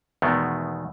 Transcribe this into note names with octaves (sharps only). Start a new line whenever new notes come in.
E2 B2 D#3 G#3 A3 B3